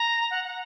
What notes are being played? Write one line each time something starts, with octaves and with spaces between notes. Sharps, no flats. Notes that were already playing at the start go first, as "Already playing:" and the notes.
Already playing: A#5
F#5
F#5